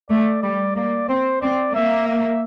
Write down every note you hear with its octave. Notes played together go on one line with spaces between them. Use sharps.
A3 D5
G3 D5
A#3 D5
C4 C5
C4 D5
A#3 E5
E5